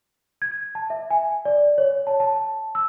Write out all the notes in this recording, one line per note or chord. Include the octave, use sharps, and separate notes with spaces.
G#6
A5
E5
G#5
D5
C#5
A5
A5
E6